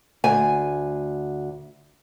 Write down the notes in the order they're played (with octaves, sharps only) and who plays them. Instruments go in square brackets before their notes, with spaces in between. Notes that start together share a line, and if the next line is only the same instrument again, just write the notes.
[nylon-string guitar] D2 G#5